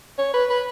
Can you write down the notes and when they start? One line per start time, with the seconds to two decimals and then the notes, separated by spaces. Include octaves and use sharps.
0.18 C#5
0.34 B4
0.50 B4